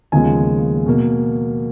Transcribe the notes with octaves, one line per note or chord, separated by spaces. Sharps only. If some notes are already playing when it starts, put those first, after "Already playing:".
D#2 C#3 F3 G#3 B3 G#5
B2 A#3